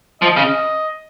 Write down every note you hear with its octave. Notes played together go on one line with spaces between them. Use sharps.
F3 D#5
C#3